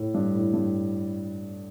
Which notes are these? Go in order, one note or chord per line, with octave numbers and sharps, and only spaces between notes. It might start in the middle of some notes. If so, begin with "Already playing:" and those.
Already playing: A2
G2
A2
G2